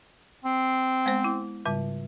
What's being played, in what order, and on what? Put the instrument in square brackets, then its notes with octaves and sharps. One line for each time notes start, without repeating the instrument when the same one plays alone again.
[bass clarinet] C4
[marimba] G#3 B3 C5
E4
G#2 C#3 G3